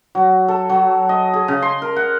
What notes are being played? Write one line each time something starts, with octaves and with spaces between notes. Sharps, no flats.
F#3
A4
F#3
D#5
G#4
C#3
C6
A#4
F#5